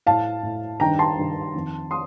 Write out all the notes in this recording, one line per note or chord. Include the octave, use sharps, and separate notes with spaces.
A2 F5 A5
A2
G2 D#3 G5 A#5
A5 C6
G2 D#3
F2 D#3
C6 D#6